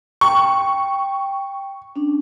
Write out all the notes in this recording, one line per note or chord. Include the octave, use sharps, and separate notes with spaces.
G5 C#6
C#4 D4